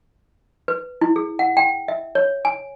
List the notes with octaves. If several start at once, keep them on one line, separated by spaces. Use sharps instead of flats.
B4
E4
G#4
F#5
G5
E5
C#5
G#5